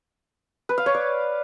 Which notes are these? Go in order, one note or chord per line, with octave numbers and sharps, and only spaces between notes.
B4
F5
C#5
D5